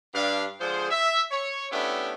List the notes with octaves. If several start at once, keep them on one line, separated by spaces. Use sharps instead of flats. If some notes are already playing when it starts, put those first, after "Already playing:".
G2 D4 F5
D3 F3 G#3 G#4 C5
E5
C#5
A3 B3 C#4 D4 E4 G4